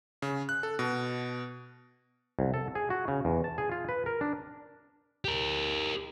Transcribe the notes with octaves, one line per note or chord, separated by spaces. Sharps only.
C#3
F#6
A4
B2
C2
A4
G#4
F#4
C#3
E2
A5
G#4
F4
B4
A#4
D4
G4 A#4